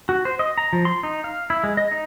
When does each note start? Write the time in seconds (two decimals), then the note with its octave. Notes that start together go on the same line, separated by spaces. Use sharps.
0.09 F#4
0.25 C5
0.39 D#5
0.58 A#5
0.73 F3
0.85 C6
1.03 D#4
1.24 F5
1.50 E4
1.64 G#3
1.77 D#5
1.91 D#4